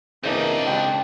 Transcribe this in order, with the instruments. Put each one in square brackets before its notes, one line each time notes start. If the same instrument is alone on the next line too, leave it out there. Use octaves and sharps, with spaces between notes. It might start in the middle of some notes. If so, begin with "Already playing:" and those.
[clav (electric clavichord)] C#3 E3 A#3 [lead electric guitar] C4 D#5 [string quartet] D4 G4
[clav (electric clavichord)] C#2 [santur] G5